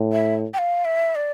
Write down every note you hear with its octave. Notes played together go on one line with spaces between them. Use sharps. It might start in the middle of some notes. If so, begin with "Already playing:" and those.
Already playing: A2
E5
G5
F5
E5
D5